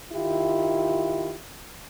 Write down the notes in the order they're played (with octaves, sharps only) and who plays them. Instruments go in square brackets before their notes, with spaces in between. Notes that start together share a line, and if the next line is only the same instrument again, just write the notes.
[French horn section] D#3 E4 F4 G4